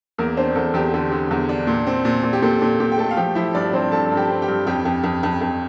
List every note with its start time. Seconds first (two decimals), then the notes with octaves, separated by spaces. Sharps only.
0.18 E2 A#3 A#4
0.37 C4 D4 C5
0.55 E2 A4
0.74 E2 G4
0.94 D3 G4
1.12 D3
1.31 E2
1.49 D4
1.67 A#2
1.87 C4
2.05 A#2
2.24 A#2
2.33 G4
2.42 A#2 A4
2.60 A#2 A4
2.80 A#2 G4 G5
2.92 G5
2.98 A3 A4 A5
3.11 F5
3.17 F3 G4 G5
3.35 F3 E4 E5
3.54 G2 D4 D5
3.73 G2 C4 C5
3.92 G2 A4 A5
4.11 G2
4.17 G4 G5
4.30 C4
4.42 G4 G5
4.48 G2
4.66 F2 G4 G5
4.85 F2
5.03 F2
5.23 F2
5.41 F2